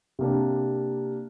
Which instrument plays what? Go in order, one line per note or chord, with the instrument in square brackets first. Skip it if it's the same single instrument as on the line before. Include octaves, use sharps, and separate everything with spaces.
[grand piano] C3 A#3 D4